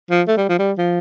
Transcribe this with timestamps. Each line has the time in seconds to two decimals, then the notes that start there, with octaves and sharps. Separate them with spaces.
0.11 F3
0.28 A3
0.37 G3
0.49 F3
0.59 G3
0.78 F3